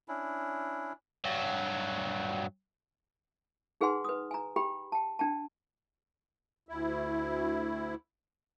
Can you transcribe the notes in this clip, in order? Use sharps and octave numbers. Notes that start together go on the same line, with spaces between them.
C#4 D4 E4
G2 F#3
D#4 G#4 B4 F#5 G#5 C6
B4 D#6
G#5 A#5
G4 G5 B5
G5 A5
D4 G5 A5
D2 E4